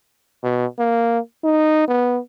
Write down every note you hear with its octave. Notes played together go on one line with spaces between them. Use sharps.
B2
A#3
D#4
B3